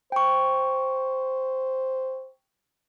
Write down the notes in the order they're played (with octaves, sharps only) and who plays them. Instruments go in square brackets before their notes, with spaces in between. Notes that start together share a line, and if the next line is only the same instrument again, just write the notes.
[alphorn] C5 [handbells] G5 C#6